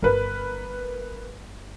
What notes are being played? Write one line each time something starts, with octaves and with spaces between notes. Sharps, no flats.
G1 A#4 B4